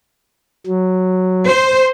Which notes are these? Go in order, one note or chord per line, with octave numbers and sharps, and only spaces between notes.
F#3
C5